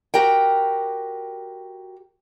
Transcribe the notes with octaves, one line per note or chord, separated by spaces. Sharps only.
F#4 G4 A#4 G5